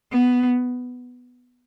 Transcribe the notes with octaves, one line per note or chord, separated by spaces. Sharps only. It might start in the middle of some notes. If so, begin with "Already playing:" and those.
B3